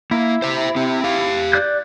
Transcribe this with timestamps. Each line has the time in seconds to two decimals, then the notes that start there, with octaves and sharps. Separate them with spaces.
0.11 A#3 E4
0.42 C5 E5
0.76 C4 G4
1.04 G4 F5
1.53 D5 F#6 G6